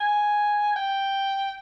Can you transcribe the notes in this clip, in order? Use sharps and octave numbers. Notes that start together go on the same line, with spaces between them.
G#5
G5